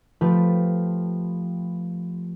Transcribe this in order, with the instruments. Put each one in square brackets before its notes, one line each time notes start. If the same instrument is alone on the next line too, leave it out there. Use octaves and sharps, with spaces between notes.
[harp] F3 A3 F4 G4 B4